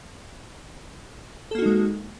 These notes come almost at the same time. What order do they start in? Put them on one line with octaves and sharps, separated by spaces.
A4 A#3 F#4 D#4 G#3